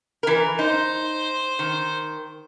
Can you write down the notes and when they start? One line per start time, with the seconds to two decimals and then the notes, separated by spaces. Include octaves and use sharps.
0.23 E3 A#4
0.59 D#4 C5
1.59 D#3